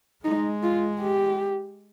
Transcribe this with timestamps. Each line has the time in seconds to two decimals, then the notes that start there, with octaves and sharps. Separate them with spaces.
0.25 G#3 D#4
0.63 F4
1.00 G4